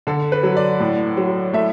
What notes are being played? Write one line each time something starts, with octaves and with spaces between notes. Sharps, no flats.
D3 A4
B4
F#3
D5
A2
F#3
A3 E5